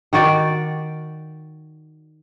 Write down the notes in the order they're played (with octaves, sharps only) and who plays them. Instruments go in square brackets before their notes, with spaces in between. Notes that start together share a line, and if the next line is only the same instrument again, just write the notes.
[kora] D#3 F#4 D5